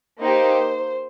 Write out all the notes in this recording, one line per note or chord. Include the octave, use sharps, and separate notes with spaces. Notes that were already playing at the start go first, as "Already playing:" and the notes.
A#3 D#4 G4 C5